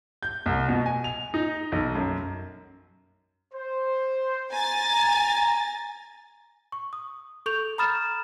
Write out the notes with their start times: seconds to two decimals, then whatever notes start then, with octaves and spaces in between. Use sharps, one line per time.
0.23 G6
0.46 C2
0.69 B2
0.86 G#5
1.04 F7
1.34 D#4
1.72 B1
1.95 F#2
3.54 C5
4.52 G#5 A#5 A6
6.72 C#6
6.93 D#6
7.46 A4 C#6 G6 F7
7.78 A#5 B5 D#6 F6 A6 E7